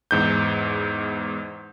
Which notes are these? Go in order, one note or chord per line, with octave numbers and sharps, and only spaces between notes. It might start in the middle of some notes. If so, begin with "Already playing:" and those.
E2 G#2 G6